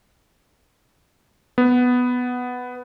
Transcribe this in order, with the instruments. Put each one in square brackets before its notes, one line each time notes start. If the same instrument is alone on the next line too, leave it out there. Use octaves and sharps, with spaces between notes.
[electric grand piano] B3